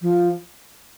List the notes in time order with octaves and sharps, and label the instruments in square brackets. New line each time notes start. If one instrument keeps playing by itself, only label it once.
[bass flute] F3